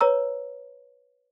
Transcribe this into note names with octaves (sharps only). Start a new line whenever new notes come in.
B4 C#5 A#5 E6